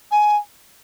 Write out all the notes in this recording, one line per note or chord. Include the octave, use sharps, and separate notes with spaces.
G#5